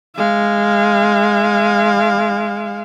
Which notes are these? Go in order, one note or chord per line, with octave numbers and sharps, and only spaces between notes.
G#3 F5